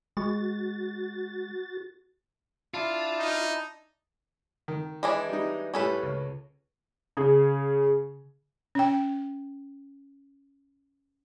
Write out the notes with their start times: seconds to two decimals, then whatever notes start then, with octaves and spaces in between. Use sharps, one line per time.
0.17 G#3 F#4 A6
2.74 D4 E4 F4 A5
3.20 D#4
4.68 D#3
5.03 E3 G#3 D4
5.29 G3 D#4
5.74 A2 G3 C#4 A4 B4
6.03 C#2
7.17 C#3 G#4
8.75 C#4 G5